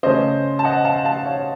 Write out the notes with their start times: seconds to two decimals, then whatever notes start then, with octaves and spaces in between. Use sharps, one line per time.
0.03 C#3 A3 C#4 C5 D#5
0.59 A5
0.65 D#5 F#5
0.85 F5 A5
1.05 F5 A5
1.26 C#5 F5